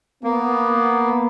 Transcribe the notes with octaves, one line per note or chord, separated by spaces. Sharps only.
A#3 B3